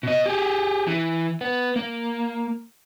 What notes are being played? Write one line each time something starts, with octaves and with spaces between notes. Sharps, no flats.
B2 D#5
G4 G#4
E3
B3
A#3